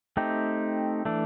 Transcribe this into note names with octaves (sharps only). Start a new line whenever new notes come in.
A3 C4 D#4 G4
E3 A3 D4